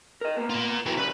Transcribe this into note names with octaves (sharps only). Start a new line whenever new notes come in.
A#4 D#5
A#3 B3
F4 A#4
E3 F#3 B3 B4 G5
C2 C#3 G3 B4